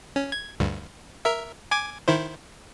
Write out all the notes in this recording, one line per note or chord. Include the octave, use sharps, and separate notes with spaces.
C#4
G#6
D2 G2
A#4 E5
G#5 D6 G#6
D#3 E4 C5